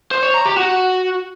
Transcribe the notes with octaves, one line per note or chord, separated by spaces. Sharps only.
C5
C#5
A#5
G4
F#4